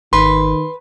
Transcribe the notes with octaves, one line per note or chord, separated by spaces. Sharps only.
G#1 D#3 B4 C6